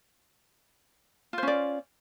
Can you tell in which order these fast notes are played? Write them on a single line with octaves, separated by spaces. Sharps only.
F4 C5 C#4 D5